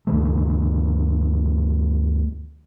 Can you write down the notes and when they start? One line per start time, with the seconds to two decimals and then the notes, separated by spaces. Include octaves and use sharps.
0.07 D2 G2 D#3 A3